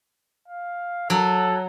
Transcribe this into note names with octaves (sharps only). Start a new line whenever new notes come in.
F5
F#3 A4